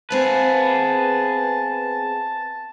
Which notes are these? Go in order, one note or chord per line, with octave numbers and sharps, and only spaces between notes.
B3 C4 G#4 B4 F5 A5